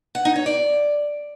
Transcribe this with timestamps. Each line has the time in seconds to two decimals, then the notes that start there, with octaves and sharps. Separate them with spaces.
0.15 F#5
0.25 D#4
0.36 C#5
0.46 D5